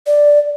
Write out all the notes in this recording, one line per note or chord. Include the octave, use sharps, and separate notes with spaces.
D5